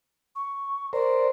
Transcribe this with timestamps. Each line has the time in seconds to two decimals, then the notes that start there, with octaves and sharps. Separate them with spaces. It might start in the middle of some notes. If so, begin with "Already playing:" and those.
0.35 C#6
0.93 A#4 C5 D5